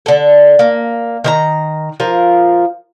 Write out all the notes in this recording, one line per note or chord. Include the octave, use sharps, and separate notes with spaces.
D3 A4
A#3
D#3 C5 A#5
F3 F4 A#4